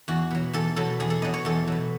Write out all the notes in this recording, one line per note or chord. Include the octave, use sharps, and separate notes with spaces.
E2 F#4
B2 F#3
E2 A4
B2 F#3 A4
E2 G#4
A4
B2 F#3 D#5
C#5
E2 A4
B2 F#3